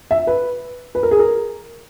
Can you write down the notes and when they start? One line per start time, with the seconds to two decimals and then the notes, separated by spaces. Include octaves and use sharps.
0.11 E5
0.27 B4
0.95 B4
1.03 A#4
1.11 G#4
1.19 A#4